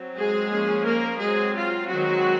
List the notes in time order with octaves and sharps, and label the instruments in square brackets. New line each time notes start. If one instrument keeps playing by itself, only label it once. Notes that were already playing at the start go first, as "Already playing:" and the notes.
Already playing: [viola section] F#3 C4
G#3 G#4
F3 A#3 C#4
A#3 A#4
F#3 G#3 C4 G#4
F4
D#3 F#3 G#3 C4 F#4